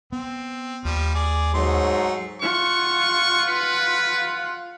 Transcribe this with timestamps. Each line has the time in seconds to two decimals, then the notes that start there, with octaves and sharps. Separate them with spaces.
0.12 B3 C4
0.85 D#2 F3 G3
1.15 G#4 D5
1.54 G#2 F#3 A3 D#4 C6
2.42 F4 F#5 C#6
3.48 B4